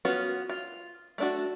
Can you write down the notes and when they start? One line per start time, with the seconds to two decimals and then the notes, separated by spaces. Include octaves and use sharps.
0.05 B3 C#4 F4 F#4
0.50 F4
1.18 A3 D4 F#4